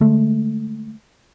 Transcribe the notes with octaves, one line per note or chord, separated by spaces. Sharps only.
D3 G#3 A3